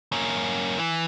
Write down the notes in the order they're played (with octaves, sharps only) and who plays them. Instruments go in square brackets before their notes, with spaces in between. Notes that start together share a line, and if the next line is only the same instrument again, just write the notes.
[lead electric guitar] A#3 C#4
E3